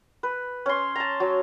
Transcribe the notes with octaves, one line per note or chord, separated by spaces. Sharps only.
B4
C#4 C6
A5 A#5
F#3